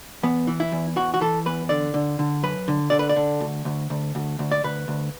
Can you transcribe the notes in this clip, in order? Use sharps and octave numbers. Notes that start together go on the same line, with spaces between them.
E2 B3
E3
E4
E2
E3 F#4
F#4
E3 A4
E2 B4
D3 D5
D3
D3
F#2 B4
D3
D3 D5
B4
D5
D3
D2
D2
D2
D2
D2
D5
D2 B4
D2